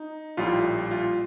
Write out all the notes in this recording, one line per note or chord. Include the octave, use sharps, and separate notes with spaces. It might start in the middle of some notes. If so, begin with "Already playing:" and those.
Already playing: D#4
A#1 A2 G3 F4
F4